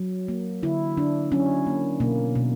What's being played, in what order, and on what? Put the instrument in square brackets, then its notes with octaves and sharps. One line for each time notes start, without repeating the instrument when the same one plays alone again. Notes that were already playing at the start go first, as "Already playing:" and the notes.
Already playing: [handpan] F#3
A#3
D3 E4
D3 D4
F#3 C#4
A#3
B2 A#3
B2